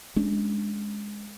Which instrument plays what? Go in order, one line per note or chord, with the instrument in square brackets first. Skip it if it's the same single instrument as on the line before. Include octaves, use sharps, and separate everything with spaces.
[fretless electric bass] G#3 C#4 D4